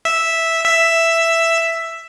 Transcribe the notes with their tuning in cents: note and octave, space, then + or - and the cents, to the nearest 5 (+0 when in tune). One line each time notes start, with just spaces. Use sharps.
E5 -5
E5 +5